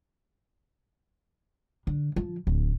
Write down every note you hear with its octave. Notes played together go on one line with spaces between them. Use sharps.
D3
F3
D1